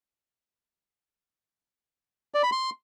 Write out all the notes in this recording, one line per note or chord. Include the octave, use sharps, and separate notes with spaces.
D5
B5
C6